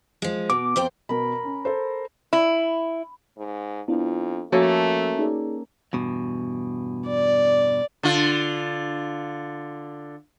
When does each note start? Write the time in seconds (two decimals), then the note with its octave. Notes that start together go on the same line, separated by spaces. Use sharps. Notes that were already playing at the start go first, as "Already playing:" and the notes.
0.22 F3 G#3
0.50 B2 D6
0.76 F2 C5 G5
1.09 B2 A#4 B5
1.43 C#4
1.65 A4 C5
2.33 E4
3.37 G#2
3.88 F2 B3 D4 E4 F4
4.52 F3 A3 A#3 C#4 F#4 A4
5.18 D#4 G#4 D5
5.93 E2 G2 B2
7.07 D5
8.03 D3 F4